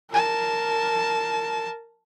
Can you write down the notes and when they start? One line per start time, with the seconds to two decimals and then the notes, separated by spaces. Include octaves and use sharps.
0.11 A#4 A5